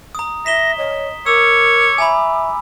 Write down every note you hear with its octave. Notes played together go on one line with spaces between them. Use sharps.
A#5 D#6
E5 A#6 B6 E7 G7
C#5 D#5
A#4 C#5 D6 E6
E5 G#5 A#5 B5